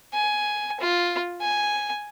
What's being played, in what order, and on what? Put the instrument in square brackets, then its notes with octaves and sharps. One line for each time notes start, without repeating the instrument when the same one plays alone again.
[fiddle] G#5
F4
G#5